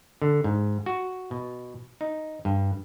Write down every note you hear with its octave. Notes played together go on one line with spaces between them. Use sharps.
D3
G#2
F#4
B2
D#4
G2